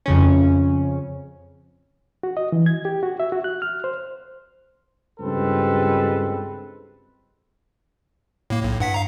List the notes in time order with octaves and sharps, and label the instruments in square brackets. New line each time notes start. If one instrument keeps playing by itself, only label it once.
[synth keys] F2 C#3 C#4
[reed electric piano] F#4
D#5
E3
G#6
G4
F#4
E5
F#4
F#6
F6
C5
[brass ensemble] C#2 G2 G#3 C4 A4 B4
[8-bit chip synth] A2 A#3
B1 A2
G2 F#5 B6
F5 A#5